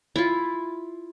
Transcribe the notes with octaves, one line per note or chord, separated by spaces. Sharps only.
E4 F4